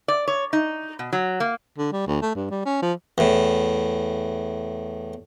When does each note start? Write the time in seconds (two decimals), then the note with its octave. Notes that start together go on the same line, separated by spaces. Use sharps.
0.08 D5
0.28 C#5
0.53 D#4
0.99 B2
1.13 F#3
1.40 A#3
1.78 D3
1.92 G3
2.07 D2
2.22 A3
2.35 G2
2.50 G3
2.65 C#4
2.82 F3
3.18 E2 A2